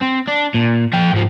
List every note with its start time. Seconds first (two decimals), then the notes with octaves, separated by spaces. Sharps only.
0.02 C4
0.28 D4
0.54 A#2
0.93 F3 G5
1.13 G#2 F3